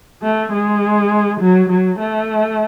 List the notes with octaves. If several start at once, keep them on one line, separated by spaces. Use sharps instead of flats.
A3
G#3
F#3
F#3
A3